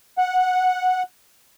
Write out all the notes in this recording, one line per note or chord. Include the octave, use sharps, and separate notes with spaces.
F#5